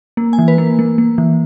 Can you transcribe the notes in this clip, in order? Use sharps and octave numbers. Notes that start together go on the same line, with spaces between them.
A#3
G#5
E3
B4
A#3
A#3
A#3
E3